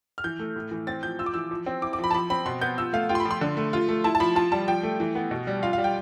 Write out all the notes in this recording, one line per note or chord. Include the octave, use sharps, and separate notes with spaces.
F6
E3 G6
A3
A2
E3
C4 A6
F3 G6
F4 E6
D6
E3 E6
F3
C4
E4 D6
D6
F3
B5
A5
F3 B5
C4 B5
B2 C6
B3 G6
F4 E6
A3 F5
F4 G5
C6
B5
F3
C6
D3
A3
F4
A3
E4 A5
A5
F3 B5
F4 A5
G3 A5
F3 G5
A3
E3
B3
B2
G3
F4 F5
G3 F5
G5